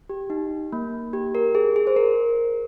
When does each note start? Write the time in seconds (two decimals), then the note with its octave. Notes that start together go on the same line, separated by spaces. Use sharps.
0.10 G4
0.30 D#4
0.73 A#3
1.13 G4
1.35 A#4
1.55 G#4
1.76 G#4
1.87 C5
1.96 A#4